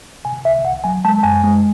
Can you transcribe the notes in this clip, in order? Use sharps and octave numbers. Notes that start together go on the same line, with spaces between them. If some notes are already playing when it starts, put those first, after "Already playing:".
C3 G#5
C2 E5
C2 F#5
F#3 G#5
G#3 A5
F#2 G#5
G#3